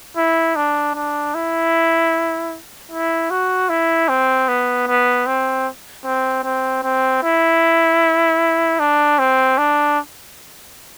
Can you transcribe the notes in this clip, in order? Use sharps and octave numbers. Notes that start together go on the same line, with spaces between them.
E4
D4
D4
E4
E4
F#4
E4
C4
B3
B3
C4
C4
C4
C4
E4
D4
C4
D4